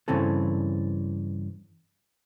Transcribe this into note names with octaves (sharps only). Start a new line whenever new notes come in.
G2 C#3 E3 C4 A4